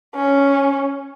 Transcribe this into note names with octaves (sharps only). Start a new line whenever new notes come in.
C#4